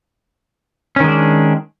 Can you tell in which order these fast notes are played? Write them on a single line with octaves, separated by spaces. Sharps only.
C#4 D#3 G#3 D4